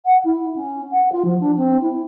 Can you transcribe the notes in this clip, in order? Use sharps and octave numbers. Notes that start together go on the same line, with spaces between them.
F#5
E4
C#4
F#5
F4
F3
D4
C4
E4